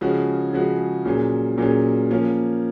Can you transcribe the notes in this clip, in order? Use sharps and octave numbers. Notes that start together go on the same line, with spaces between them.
C#3 F3 G#3 C#4 F#4
C#3 F3 G#3 C#4 F#4
A#2 F#3 C#4 G#4
A#2 F#3 C#4 G#4
F3 A#3 C#4